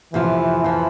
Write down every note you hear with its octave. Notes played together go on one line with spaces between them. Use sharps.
F2 C3 E3 F3
F2 C3 F3